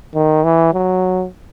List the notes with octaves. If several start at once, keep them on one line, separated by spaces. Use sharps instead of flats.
D#3
E3
F#3